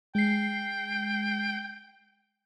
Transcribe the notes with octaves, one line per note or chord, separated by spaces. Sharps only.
G#3 G5 C7